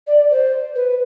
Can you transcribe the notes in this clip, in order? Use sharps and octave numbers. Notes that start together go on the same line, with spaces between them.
D5
C5
B4